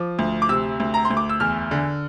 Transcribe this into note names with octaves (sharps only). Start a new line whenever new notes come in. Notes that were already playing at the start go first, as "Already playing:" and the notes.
Already playing: F3 D6
D2
D6
C3 E6
D2
A#5
C6
D2
D6
E6
E2 F6
D3